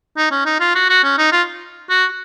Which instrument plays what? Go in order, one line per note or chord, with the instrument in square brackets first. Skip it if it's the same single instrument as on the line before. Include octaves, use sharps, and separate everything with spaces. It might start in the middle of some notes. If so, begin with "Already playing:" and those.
[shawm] D#4
C#4
D#4
F4
F#4
F#4
C#4
D#4
F4
F#4